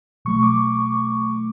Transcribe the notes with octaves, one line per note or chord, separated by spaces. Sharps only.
B2 F#3 A3 C#6
D6
D6